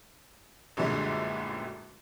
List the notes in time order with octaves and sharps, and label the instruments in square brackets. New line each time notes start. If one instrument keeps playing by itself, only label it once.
[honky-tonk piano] A1 F#2 A#2 D3 G3 G#3